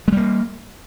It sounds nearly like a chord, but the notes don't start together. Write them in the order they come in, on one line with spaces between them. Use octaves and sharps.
G#3 G3 A#3